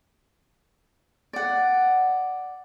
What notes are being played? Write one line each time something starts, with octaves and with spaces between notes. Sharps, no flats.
D5 F#5